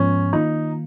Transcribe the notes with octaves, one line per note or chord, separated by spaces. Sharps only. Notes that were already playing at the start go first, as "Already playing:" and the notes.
Already playing: G#2 F3 B3 C#4
D#3 A#3 D#4 F4